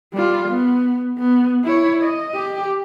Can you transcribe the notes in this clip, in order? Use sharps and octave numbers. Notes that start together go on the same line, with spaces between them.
G3 F4
B3
B3
E4 C#5
D#5
G4